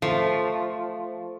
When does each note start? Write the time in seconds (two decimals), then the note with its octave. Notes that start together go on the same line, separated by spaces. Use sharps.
0.02 F3 A3